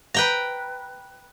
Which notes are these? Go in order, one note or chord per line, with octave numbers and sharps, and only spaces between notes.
B4 G5 A#5